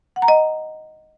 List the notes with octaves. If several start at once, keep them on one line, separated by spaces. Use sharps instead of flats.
F#5
A#5
D#5